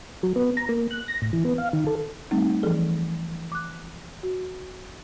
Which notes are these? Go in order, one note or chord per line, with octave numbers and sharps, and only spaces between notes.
F#3
B3
A#5
A#3
F#6
A#6
A2
E3
B3
F5
D#3
A4
G3 A3 C4 D#4
E3 F3 G#4 A4
D6 F#6
F#4